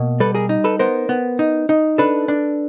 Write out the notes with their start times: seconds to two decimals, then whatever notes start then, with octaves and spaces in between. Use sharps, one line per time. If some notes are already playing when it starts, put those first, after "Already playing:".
Already playing: B2 A#3
0.20 G3 A4 B4
0.34 G#4 A#4
0.49 D#4
0.64 A4 B4
0.79 B3 A#4 C5
1.09 B3
1.39 D#4
1.69 D#4
1.98 D4 A4 B4
2.28 D4